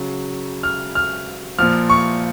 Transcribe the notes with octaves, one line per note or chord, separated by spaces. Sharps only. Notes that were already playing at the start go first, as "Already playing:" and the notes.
Already playing: C#3 F#3
F6
F6
A#2 F3 F6
C#6